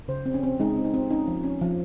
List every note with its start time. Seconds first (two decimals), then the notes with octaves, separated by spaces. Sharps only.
0.08 C#3 C5
0.26 C4
0.34 C#4
0.43 C4
0.60 G#3 D#4
0.76 C4
0.85 D#4
0.94 C4
1.11 C#4 D#4
1.28 F3
1.44 C#4
1.61 F3